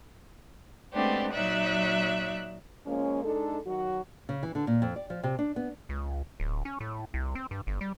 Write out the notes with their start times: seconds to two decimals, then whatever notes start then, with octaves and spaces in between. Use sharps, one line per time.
0.93 G#3 A3 B3 C4 D4 G4
1.33 A#2 F#3 D#4 D5 E5 F#6
2.85 F3 G#3 A#3 C#4
3.23 G#3 D4 D#4 A4
3.66 D#3 F#3 F#4
4.29 C#3
4.43 E3
4.55 D3
4.67 A#2
4.82 F2
4.96 D5
5.10 F3
5.24 C3
5.39 D4
5.56 B3
5.89 C#2
6.40 D1
6.65 C#4
6.80 A2
7.14 C2
7.35 C4
7.51 G2
7.67 G1
7.81 G3